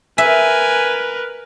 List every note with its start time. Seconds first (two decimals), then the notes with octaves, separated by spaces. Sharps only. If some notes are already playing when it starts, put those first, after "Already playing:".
0.18 A#4 B4 E5 G#5